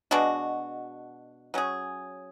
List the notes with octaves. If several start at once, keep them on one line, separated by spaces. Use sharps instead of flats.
B2 G#3 D4 F#4
F#3 C#4 G#4